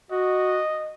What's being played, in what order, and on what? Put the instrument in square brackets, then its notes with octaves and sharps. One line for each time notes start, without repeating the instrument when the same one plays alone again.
[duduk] F#4 [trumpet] D#5